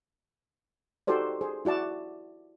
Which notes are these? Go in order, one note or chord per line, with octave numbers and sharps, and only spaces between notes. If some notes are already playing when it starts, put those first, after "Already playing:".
D#4 F#4 G4 A4 C5 D5
G#4 C5
E4 F#4 D5 A5